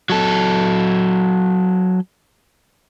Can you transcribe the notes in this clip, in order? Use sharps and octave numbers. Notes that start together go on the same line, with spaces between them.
F#3 A4